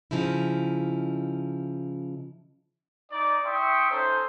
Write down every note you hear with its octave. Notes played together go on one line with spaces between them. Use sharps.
C#3 F3 D#4 E4
D#4 D5
E4 E5 G5 C6 C#6 D#6
C#4 D#4 A4 C5